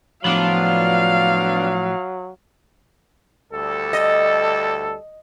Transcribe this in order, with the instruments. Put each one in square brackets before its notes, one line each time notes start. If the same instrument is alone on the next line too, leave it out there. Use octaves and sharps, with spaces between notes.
[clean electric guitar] A2 F3 B5 [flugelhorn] F#3 [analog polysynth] B3 D4 F4 [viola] F5
[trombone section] D2 G3 A4
[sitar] D#5